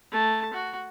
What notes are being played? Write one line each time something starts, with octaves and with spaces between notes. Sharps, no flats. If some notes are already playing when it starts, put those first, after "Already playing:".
A3 A5
F#4